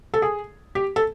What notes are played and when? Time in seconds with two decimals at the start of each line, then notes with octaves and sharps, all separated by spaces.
0.14 A4
0.22 G#4
0.75 G4
0.96 A4